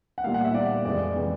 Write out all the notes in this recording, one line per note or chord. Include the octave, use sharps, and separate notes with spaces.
F#5
A#2 G3 A#3 F5
F#5
E5
A#2 G3 A#3 D5
F2 C3 E3 G#3 D5
C3 E3 G#3